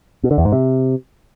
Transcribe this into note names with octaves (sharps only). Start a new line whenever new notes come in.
B2
D3
E2
G#2
C3